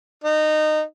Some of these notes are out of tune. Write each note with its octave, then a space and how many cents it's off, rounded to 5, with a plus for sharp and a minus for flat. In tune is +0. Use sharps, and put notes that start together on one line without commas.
D#4 -20